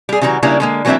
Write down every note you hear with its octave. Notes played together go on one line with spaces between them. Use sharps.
G3 G#4
C#3 E3 G3 F#4 A#5
C#3 G3 A#3 D4 E4 A#5
D3 G#3 A#3
E3 F#3 A#3 C4 D4 E5